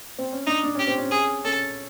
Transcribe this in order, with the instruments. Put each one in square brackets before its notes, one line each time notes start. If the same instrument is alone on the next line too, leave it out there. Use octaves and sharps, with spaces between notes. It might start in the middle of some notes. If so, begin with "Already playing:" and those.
[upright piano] C4
C#4
[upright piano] D4 [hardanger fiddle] D#4
[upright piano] D4
[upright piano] C#4 [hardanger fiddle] G4
[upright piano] C4
C#4
[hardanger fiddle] G#4
[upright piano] C#4 [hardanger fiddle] A4